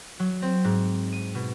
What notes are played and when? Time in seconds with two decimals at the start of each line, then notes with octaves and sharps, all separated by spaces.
0.19 F#3
0.42 C4
0.64 G#2
1.12 D#7
1.35 B2